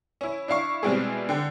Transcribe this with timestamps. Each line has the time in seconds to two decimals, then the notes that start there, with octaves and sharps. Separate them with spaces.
0.21 C#4 E4
0.48 D4 E4 F5 C#6
0.83 B2 G3 G#3 C4 E4 G#4
1.29 D3 G5